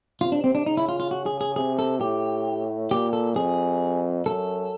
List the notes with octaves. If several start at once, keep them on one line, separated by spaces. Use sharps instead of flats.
C3 F4
D4
C4
D4
C#3 D#4
E4
F4
F4
F#4
G#4
G#4
C3 G#4
A4
A2 G4
A#2 G4
A4
F2 G#4
F#2 A4